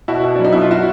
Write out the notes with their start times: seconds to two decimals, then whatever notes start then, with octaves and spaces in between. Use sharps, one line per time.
0.08 B2 E4 F#4
0.24 B2
0.35 F#3 D4
0.44 D#4
0.52 B2 E4
0.61 F4
0.71 E4 F#4